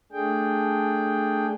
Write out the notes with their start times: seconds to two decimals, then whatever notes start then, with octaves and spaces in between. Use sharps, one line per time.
0.12 A3 D4 G#4 G5